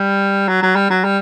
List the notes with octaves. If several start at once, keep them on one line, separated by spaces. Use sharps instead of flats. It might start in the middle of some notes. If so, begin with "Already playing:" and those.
Already playing: G3
F#3
F#3
G3
F#3
G3